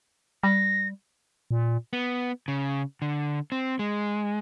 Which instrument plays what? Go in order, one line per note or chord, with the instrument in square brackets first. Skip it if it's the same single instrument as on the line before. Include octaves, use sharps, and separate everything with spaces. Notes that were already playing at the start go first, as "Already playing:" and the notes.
[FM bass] G3 [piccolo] A#6
[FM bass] A#2
[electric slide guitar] B3
C#3
D3
C4
G#3